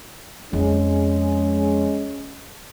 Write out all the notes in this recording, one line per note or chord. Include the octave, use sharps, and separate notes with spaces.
F2 G#3 C#4